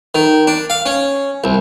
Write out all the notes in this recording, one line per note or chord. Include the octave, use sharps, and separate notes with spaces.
D#3
D4
F5
C#4
C2